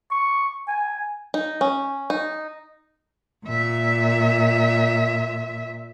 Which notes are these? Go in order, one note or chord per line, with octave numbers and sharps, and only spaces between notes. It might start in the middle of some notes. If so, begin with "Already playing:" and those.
C#6
G#5
D#4
C#4
D#4
A#2 E5